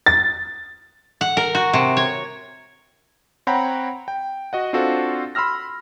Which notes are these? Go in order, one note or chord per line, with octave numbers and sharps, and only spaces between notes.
A6
F#5
A#4
F#4
C3
C#5
C4 C#5 F#5 G5 A#5 B5
G5
F#4 D#5 F#5
C4 D4 F4 F#4 A4 C5
B5 C6 E6 F6 A#6